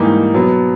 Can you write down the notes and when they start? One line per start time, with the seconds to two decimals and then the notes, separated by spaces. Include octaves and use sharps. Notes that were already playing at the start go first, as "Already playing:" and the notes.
Already playing: G#2 E3 G3 A#3 D#4
0.34 B2 F#3 B3